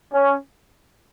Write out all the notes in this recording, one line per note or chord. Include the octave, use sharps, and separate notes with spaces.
C#4